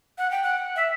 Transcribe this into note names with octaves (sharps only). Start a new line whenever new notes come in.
F#5
G5
F#5
E5